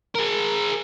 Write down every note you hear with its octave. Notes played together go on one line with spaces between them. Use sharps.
G#4 A#4